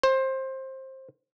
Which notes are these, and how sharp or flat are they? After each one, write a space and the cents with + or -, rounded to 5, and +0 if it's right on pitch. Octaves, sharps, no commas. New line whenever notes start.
C5 +20